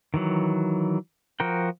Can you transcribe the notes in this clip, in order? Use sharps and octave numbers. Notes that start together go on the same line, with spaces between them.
D#3 E3 F#3
F3 F#4 A#4 G5